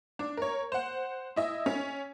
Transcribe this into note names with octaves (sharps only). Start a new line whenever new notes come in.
D4
A#4 C#5
C5 F#5
E4 D#5 E5
C#4